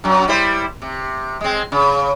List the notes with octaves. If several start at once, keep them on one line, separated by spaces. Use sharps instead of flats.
F#2 F#3
G3 E4 C5
C3
G#3 C4
C#3